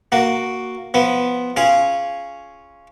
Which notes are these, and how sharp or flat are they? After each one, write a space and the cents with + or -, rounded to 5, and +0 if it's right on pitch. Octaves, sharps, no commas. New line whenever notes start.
A#3 +0 F#4 +0
F3 +0 B3 +0
C#4 +0 F4 -15 G#4 +0